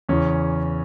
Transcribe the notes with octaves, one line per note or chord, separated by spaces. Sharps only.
E2 C#3 E3 C#4